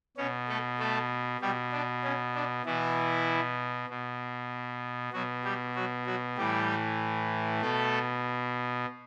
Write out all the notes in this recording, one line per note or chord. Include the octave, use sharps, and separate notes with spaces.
B2 C#4 C#5
A3 A4
A3 A4
B2 G3 G4
D4
C#4
D4
B2 E3 E4
B2
B2 F#3 F#4
G3 G4
F#3 F#4
F#3 F#4
A2 E3 G3 G4
B2 A3 A4